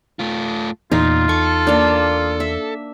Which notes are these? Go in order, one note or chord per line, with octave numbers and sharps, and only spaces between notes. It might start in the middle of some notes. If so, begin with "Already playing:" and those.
A3 F4
E2 A#2 D#4 F4
A4 C#6
A#3 D4
E5